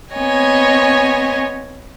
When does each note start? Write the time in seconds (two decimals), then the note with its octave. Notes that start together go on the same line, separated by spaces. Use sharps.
0.13 B3 C4 C#5 D#5 G#5